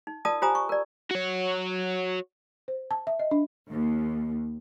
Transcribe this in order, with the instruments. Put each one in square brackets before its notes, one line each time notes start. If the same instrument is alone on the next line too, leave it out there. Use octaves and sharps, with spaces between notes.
[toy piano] D#4
F4 A#4 D5 A5 D#6
F4 G4 C5 G#5 A#5 D#6
C#6
A#4 D5
[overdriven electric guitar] F#4 C#5
[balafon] C5
A5
E5
D#5
D4
[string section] D#2